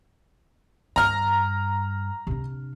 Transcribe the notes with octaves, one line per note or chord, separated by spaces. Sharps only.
G2 A#5 F6
C3 D4